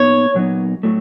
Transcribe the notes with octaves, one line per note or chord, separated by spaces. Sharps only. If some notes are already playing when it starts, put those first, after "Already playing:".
Already playing: A#2 B3 D#4 C#5
A#2 F#3 B3 D#4
A2 F#3 A3